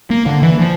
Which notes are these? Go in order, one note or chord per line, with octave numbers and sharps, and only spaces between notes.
A#3
D3
E3
F3